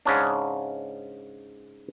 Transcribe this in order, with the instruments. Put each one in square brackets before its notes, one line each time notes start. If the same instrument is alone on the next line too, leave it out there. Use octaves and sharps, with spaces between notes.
[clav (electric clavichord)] G#2 C#3 C#4 D4